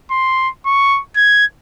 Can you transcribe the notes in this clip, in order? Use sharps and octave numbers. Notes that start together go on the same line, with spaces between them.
C6
C#6
G#6